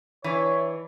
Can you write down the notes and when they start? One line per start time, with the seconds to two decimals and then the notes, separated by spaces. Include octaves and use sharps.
0.24 E3 D4 C#5